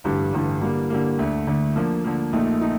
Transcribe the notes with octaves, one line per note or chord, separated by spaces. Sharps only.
A1 G2 D3 G3
A1 G2 D3 G3
D3 G3 A#3
D3 G3 A#3
D2 D3 A3
D2 D3 A3
D3 F3 A#3
D3 F3 A#3
A#1 A#2 A3 D#4
A3 D#4